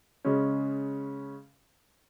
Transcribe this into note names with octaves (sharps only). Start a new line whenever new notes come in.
C#3 G#3 C#4